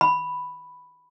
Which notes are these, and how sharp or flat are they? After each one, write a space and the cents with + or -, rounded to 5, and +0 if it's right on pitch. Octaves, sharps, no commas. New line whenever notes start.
B5 +0